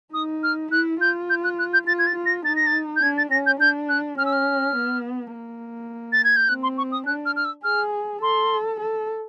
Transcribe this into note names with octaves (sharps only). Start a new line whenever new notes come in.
D#4 D#6
F6
E4 F#6
F4 G6
G6
F#6
F#6
G6
F4 A6
G#6
A6
F4
A#6
D#4 A6
A#6
A6
G6
D4 G#6
A6
C#4 A#6
G6
D4 G6
F#6
C#4 F6
E6
F6
B3
A#3
A6
G#6
G6
C4 F#6
C6
C#6
D#6
D4 F#6
F6
F6
E6
G#4 F6
A4 C6
A4